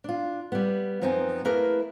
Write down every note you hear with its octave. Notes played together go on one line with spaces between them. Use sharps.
D4 F4
G3 B3
F#2 F3 B3 C4 D#4 G#5
A3 A#3 E4 G#4 A#4 B4